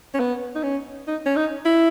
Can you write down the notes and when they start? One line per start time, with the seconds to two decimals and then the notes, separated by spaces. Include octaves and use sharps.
0.14 C#4
0.20 B3
0.55 D#4
0.63 C#4
1.07 D#4
1.26 C#4
1.36 D#4
1.65 E4